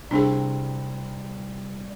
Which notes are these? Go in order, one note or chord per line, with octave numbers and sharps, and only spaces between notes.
C2 G3 C4 D4 G#4